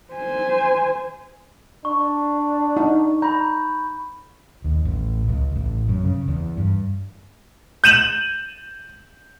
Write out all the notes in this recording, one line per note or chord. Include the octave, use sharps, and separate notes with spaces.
C5 G#5
D4 C#6
D#4
A#5 B5 G6
D#2
A1
C#2
A1
F#2
C#3
E2
G2
G6 D#7 E7 F#7